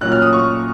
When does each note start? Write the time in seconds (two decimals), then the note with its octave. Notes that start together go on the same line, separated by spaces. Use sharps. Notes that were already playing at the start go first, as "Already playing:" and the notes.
0.01 A#2 F#3 C#4 F#6
0.12 F6
0.22 D#6
0.33 C#6